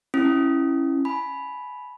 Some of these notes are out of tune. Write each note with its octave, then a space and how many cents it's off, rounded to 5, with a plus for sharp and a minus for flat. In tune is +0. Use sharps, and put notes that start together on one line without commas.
C#4 -15 E4 +10
G#5 +35 B5 +0